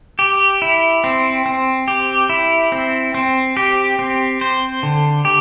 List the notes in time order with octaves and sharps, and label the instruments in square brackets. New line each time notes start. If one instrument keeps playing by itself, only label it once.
[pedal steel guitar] G4
E4
C4
C4
G4
E4
C4
C4
G4
C4
C5
D3
G4